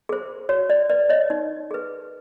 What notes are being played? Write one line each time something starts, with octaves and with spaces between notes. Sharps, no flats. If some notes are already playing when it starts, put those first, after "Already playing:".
G#4 C5
F#4 C#5
D5
B4 D5
C#5 D#5
D#4
G#4 B4